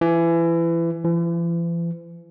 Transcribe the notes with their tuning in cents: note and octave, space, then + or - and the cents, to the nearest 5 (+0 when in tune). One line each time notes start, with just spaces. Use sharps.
E3 +25
E3 +45